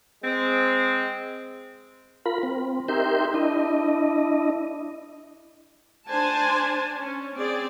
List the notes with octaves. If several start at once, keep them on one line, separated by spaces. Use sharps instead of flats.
G#3 C4
F4 A#4 B5
C4
D#4 G4 A#4 E5 C6 G6
D4 E4 D#5
D4 C5 G#5 A5
C#4
C4 G#4 D5